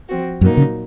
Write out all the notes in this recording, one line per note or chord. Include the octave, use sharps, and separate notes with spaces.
F3 C4 F#4
F#2 A#2 F#3 A#3 D#4
C#3